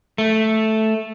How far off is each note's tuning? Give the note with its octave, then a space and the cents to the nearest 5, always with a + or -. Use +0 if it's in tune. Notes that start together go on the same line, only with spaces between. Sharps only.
A3 -5